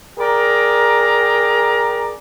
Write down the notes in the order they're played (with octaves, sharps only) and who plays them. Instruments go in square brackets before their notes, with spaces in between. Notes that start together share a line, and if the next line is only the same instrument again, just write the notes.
[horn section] G#4 A#4 D5 G5 A#5